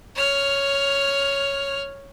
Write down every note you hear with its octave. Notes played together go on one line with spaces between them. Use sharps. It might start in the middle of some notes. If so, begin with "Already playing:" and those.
C#5 F6